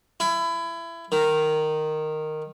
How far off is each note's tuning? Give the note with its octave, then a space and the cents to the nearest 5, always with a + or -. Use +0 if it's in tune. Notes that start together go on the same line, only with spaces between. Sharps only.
E4 +25
D#3 -10